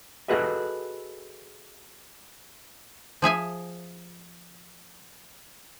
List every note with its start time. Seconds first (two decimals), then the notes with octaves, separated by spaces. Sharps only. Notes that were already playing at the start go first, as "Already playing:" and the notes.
0.28 F#4 G#4 A4 B4 D#5 E5
3.22 F3 G#4 E5 G#5